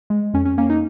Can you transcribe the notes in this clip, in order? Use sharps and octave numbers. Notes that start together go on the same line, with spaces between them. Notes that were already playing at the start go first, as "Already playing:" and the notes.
G#3
F2 C#4
C#4
A#3 C#4
D#4